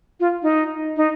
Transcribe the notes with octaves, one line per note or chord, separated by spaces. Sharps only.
F4
D#4
D#4